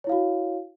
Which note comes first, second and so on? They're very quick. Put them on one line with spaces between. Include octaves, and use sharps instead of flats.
C#5 E4 F5 F#4